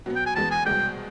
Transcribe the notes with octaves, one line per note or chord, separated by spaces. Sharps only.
B2 F#3 B3
G5
G#5
E2 B2 G#3 B3 A5
G#5
C2 B2 G#3 G5